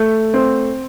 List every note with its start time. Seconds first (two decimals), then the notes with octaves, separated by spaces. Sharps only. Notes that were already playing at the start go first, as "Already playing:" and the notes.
Already playing: A3
0.34 C4